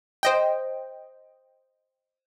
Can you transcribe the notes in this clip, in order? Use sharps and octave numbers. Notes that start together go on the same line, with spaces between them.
C5 D#5 G5